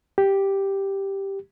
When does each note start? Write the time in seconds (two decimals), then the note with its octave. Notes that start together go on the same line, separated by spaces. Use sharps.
0.18 G4